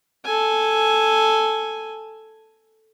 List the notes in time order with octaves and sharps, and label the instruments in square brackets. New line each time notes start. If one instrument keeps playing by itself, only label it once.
[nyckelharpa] A4 G#5